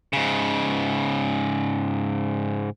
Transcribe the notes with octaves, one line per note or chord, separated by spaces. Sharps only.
G#2 C#3